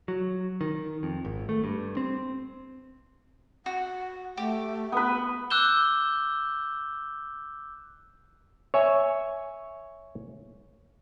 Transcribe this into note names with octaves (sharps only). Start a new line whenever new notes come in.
F#3
D#3
F2
G#1
A3
G2
C4
F#4 F#5
A3 G4
B3 B4
D6 E6 F#6 G6 E7 G7
C#5 E5 G#5